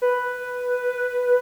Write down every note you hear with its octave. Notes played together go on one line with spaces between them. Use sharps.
B4